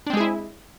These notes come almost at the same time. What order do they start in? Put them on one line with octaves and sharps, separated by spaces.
D4 C4 G#3 G#4 E4